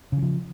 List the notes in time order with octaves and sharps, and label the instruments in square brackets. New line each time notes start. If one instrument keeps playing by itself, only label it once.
[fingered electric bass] C#3
E3
F3